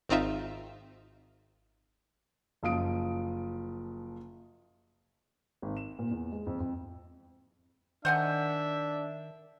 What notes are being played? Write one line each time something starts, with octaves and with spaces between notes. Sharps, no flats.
G#1 C4 D#4 F4 E5
F#1 F3 D#6 D7
G#1
E7
A#2
E2
G#3
F2
F2
D#3 D4 C5 E5 F#5 G#5